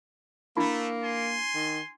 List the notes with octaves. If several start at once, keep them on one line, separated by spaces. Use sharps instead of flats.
A3 A#3 D4 E4 B5
G#5 C6
D#3